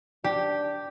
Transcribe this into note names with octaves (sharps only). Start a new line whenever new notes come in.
D4 G4